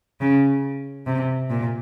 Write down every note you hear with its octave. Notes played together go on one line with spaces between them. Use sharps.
C#3
C3
A#2